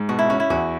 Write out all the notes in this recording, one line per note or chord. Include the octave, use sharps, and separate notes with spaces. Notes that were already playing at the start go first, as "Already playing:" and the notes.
Already playing: G#2
B2 F#4
E4
C#4 F#4
E4
E2 F#4